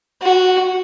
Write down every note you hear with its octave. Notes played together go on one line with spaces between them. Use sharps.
F#4